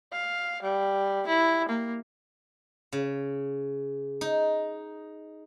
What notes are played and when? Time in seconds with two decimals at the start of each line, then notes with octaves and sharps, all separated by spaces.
0.12 F5
0.62 G3
1.27 E4
1.68 A#3
2.92 C#3
4.21 D#4